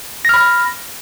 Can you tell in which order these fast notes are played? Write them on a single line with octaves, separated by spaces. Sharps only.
A#6 F6 B5